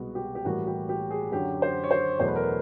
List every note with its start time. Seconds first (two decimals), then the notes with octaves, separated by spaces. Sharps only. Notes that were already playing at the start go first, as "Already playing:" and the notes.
Already playing: C2 B2 G#3 B3 F#4
0.15 G4
0.35 G4
0.45 A2 E3 G3 A#3 F#4
0.67 G4
0.89 G4
1.11 G#4
1.32 F#2 D3 F#3 G4
1.62 C5
1.84 C#5
1.91 C5
2.20 E2 B2 F#3 A3 C5
2.28 B4
2.36 A#4
2.43 B4